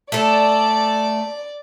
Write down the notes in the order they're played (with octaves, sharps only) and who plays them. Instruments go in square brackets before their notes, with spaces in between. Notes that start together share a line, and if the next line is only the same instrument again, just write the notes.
[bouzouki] A3 A4 [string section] D5